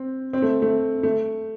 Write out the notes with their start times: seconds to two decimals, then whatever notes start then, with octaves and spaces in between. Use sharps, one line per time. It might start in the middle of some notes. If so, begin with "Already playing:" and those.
Already playing: C4
0.33 C4
0.42 A3
0.62 A3
1.03 A3